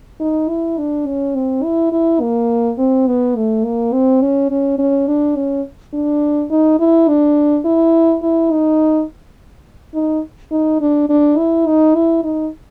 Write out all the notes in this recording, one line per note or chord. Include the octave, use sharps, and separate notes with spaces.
D#4
E4
D4
C#4
C4
E4
E4
A#3
C4
B3
A3
A#3
C4
C#4
C#4
C#4
D4
C#4
D4
D#4
E4
D4
E4
E4
D#4
D#4
D#4
D4
D4
E4
D#4
E4
D#4